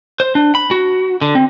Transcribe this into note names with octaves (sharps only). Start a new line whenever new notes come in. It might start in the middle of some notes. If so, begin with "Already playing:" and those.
C5
D4
B5
F#4
D3
C4